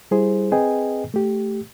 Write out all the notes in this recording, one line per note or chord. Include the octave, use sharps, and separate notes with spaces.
G3 E4 G#4 C5
C4 G#4 B4 D#5 G5 G#5
A3 G4